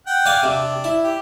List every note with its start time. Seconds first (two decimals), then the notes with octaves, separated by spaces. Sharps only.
0.07 F#5 G5
0.26 D5 F5 G#5
0.43 C3 D4
0.84 E4
1.04 G4